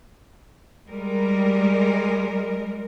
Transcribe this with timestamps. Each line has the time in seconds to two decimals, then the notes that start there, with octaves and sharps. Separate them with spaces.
0.90 G3 G#3 A#4